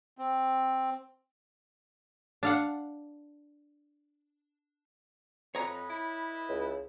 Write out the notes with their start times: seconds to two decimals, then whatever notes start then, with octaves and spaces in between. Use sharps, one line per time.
0.18 C4
2.43 D4 F5 F#5
5.55 F2 B4 C#5 D#5 A#5
5.90 E4
6.49 C#2